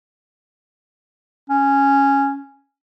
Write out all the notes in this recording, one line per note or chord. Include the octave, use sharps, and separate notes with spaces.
C#4